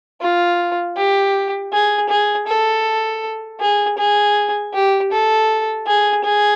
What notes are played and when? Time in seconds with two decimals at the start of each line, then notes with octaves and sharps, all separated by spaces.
0.21 F4
0.97 G4
1.72 G#4
2.09 G#4
2.47 A4
3.60 G#4
3.98 G#4
4.73 G4
5.12 A4
5.86 G#4
6.24 G#4